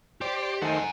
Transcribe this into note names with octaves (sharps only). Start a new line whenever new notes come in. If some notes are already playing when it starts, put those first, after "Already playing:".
G4 C5 D5
D#3 A3 C5 F#5 G#5